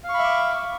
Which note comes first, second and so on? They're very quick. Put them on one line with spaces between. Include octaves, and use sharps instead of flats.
F5 C#6 B5 E5 D6